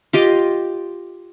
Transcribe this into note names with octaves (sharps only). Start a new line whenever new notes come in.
F4 G4 D#5 G5